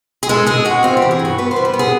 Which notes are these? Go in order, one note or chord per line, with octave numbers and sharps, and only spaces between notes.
G#4
G#3 A4
G#3 G#4
G#3 F#4
C4 F4
G4
E3
G#4
G2
F#4
B3 B4
C5
G3
B4
B3
G#4